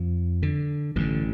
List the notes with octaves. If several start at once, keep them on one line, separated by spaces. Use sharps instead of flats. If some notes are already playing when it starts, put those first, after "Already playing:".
Already playing: F2 F3
D3
A1 G2 D3 E3